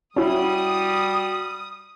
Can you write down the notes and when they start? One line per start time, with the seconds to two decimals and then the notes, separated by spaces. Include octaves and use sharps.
0.16 G3 C#4 E4 F#4 D#6